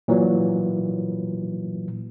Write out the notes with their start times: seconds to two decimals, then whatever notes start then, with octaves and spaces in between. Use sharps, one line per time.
0.08 A#2 E3 F#3